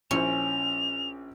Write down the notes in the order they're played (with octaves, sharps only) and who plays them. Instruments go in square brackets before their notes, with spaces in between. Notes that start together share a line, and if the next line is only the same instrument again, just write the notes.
[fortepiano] A#1 E4 C5 [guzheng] C#4 [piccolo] F7